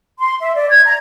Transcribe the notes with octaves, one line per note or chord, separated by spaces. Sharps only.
C6
E5
D5
G#6
A#5